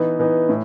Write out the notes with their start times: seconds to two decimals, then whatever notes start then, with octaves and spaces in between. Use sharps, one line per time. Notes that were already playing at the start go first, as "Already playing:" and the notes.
Already playing: E3 B3 D#4
0.19 E3 B3 D#4
0.49 A2